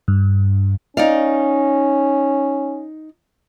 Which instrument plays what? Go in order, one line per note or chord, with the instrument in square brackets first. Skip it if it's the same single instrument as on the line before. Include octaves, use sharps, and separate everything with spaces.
[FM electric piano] G2
[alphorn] C#4 [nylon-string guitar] D#4 D5 F5